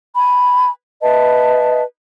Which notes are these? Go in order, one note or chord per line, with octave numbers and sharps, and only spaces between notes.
G#5 B5
B4 D#5 E5 A5